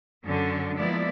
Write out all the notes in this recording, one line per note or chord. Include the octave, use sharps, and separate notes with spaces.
F#2 D3 C#4
F3 G#3 A#3 B3 E4 D5